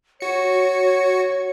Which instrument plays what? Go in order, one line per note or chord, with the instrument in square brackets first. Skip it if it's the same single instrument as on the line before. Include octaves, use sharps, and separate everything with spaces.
[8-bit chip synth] F#4 C#7 [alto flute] C#5